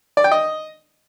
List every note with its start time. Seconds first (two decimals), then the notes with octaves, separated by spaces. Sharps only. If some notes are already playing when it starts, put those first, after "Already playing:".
0.17 D5
0.24 G5
0.32 D#5